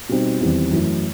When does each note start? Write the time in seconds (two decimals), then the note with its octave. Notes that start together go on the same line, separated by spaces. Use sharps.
0.09 B2 G3 C4 D#4
0.40 E2 D#3 G3 C4 E4
0.71 F#2 E3 A3 E4